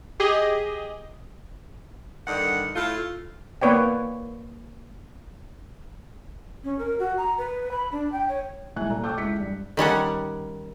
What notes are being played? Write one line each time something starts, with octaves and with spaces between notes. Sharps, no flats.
G4 G#4 D#5
G2 D3 D#3 F#5
A2 A3 F4
A#3 B3 B4 C#5 D5 G5
C#4
A#4
F#4
A#5
B4
B5
D4
G5
C#5
D#1 G#2 E4 G#5 F#6
A#2 A4 A#5
G5 A5 C#6 D6 E6 G6
C#2 E4 B6 C#7
G2
D#3 G3 C#4 F#5